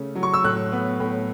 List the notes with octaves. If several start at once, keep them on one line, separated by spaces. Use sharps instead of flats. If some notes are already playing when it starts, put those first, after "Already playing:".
Already playing: C#3 A3 C#4
F#3
C#6
E6
A2 F#6
B3
A2